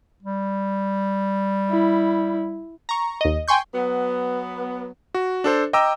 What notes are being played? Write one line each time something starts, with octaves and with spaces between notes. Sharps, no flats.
G3
E4
A#5 C#6
D#2 D#5
G5 G#5 C6 C#6 G6
F#3 B3
F#4
D4 A4 C5
D#5 G5 A#5 D6 E6